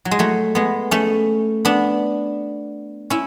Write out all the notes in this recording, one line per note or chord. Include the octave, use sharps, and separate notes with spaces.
F#3
G#3
F#3 A3
G#3 B3
A3 C#4
B3 D4
C#4 E4